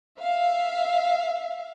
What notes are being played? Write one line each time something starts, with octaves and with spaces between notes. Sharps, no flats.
E5 F5